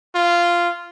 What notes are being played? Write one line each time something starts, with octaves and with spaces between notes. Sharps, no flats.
F4